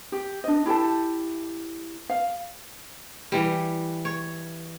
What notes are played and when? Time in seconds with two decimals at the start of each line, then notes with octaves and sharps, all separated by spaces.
0.12 G4
0.44 D4 D#5
0.66 E4 G4 A4 A5
2.10 F5
3.32 E3 G3
4.05 C#5